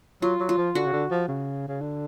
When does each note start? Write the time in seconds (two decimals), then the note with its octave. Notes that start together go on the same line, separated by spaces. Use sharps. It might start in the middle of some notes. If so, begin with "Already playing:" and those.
0.22 F#3 F4
0.40 F#3
0.49 F4
0.57 F3
0.75 D3 F#4
0.86 C#3
0.93 D3
1.11 F3
1.28 C#3
1.68 C#3
1.81 D3